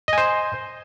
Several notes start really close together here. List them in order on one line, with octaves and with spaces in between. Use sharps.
D#5 G#5 C5